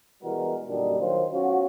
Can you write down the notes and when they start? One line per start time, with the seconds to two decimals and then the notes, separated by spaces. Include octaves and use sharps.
0.22 B2 E3 G3 G#3 F#4 A#4
0.67 F#2 A#2 D3 G3 D4 D#4
0.99 D#3 F#3 F4 C5
1.32 B1 C#4 F4 F#4